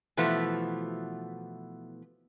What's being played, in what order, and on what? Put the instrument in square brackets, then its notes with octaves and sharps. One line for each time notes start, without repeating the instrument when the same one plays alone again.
[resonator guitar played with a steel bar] B2 E3 F3 A3 B3